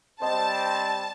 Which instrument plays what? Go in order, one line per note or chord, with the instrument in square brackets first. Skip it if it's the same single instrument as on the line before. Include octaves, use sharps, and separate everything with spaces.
[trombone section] G3 C4 [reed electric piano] C5 D#5 [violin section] A5